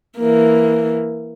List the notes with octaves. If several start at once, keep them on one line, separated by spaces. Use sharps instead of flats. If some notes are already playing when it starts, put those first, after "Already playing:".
E3 A#3